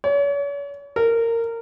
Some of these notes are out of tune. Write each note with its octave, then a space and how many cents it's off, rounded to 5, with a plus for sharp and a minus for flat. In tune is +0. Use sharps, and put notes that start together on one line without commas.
C#5 +40
A#4 -20